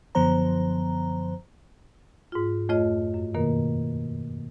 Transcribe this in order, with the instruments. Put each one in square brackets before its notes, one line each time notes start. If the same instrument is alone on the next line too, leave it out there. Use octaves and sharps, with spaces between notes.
[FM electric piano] F#2 D3 F3 B3 C5 A#5
[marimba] G#2 F4
F2 A3 F4 C#5 D#5
F#2
B2 D#3 A#3 A#4